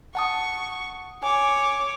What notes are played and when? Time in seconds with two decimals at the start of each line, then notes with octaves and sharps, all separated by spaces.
0.15 F#5 A5 C#6 D#6
1.23 C#5 G#5 D6